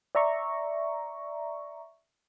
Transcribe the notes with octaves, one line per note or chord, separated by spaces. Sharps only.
D5 E5 A#5 C#6